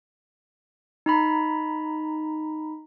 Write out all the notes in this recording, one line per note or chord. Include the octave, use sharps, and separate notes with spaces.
D#4 A#5 B5